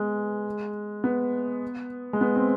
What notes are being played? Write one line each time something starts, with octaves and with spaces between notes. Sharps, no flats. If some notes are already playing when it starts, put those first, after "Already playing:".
Already playing: G#3 B3
B3
G#3
B3
C4